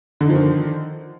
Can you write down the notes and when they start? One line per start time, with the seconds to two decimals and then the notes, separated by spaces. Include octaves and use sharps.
0.21 D3
0.25 D#4
0.29 F3
0.33 D#3